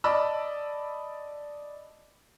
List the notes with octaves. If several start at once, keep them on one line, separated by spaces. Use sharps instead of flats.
D5 D#5 A5 B5 D6 E6